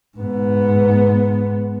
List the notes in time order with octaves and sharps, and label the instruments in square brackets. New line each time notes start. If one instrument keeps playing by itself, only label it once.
[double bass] G#2 B3